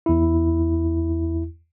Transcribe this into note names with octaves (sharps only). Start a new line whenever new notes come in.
E2 E4